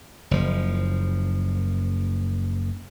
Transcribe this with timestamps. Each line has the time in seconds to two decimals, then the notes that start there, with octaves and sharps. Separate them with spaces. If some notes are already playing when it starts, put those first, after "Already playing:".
0.31 F#1 F3